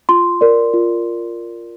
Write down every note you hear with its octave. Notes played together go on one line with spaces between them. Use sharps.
F4 C6
A#4 D5
F4